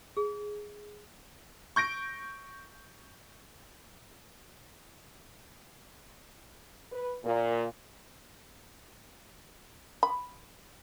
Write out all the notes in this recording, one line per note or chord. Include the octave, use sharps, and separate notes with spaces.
G#4
C#6 G6 A#6 D7
B4
A#2
B5